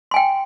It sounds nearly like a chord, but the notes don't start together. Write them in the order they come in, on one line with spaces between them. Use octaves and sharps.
C6 G#5 G5